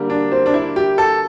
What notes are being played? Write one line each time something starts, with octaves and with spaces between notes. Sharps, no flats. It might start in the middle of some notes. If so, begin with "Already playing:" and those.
Already playing: D3 G3 A#3
D4
C4
D4
E4
G4
A4